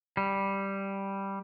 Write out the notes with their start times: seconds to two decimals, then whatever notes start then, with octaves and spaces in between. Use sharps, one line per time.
0.17 G3